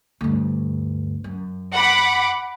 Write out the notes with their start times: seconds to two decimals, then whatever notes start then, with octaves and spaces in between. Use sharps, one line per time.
0.21 D2 G2
1.24 F#2
1.73 F#5 B5 D6